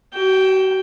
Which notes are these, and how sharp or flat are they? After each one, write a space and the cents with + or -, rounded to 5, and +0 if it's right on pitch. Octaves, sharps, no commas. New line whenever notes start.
F#4 +40 G5 +0